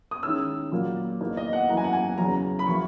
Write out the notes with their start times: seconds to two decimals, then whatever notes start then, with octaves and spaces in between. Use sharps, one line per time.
0.11 D#6
0.23 D#3 G#3 C#4 E4 E6
0.71 A#2 F#3 A#3
1.20 E2 D#3 A#3 D#4
1.37 D#5
1.53 F#5
1.69 F#2 E3 A#3 E4 A#5
1.77 G#5
1.84 F#5
1.93 G#5
2.18 E2 C#3 F#3 C#4 A#5
2.59 B5
2.67 F#3 A#3 E4 C#6